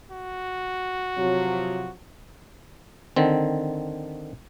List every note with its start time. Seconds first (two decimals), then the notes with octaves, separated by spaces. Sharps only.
0.11 F#4
1.17 C3 F3 F#3
3.16 D3 D#3 C4